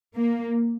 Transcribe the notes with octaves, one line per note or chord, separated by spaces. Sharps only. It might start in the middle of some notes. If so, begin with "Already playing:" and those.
A#3